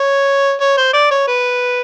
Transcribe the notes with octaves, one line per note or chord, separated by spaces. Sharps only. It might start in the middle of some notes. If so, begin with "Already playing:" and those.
Already playing: C#5
C#5
C5
D5
C#5
B4